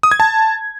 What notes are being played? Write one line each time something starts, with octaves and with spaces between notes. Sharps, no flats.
D#6
G#6
A5